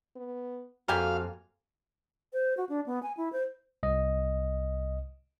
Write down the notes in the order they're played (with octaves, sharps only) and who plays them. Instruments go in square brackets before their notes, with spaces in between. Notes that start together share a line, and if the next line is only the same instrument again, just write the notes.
[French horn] B3
[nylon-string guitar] F2 [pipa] A#3 G4 G#5 [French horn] F#4 [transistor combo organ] F5
[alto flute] C5
F#4
D4
B3
G#5
E4
C5
[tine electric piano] C2 D#5